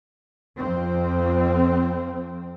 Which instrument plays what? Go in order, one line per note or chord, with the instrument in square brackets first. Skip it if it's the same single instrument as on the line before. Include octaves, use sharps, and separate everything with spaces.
[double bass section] F2 C4